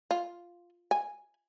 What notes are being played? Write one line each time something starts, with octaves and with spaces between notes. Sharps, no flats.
F4
G#5